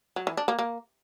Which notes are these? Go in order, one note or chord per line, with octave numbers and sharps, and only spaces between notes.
F#3
E3
D4
A#3
A#3